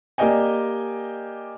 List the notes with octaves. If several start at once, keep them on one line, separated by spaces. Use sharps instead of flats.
A#3 G4 D5 D#5 G5 G#5